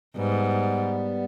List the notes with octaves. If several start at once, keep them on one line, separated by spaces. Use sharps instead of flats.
G#2 G3 B3